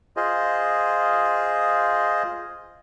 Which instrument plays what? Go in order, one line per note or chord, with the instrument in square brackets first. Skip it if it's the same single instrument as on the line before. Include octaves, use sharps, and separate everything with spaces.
[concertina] F4 G#4 C5 D#5